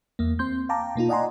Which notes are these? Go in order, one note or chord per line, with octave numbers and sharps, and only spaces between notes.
E2 A#3
C4 C6 G6
F5 G5 A5 A#5 D6
B2 A#3 D#4 F4
D5 D#5 F#5 G#5 A#5 C6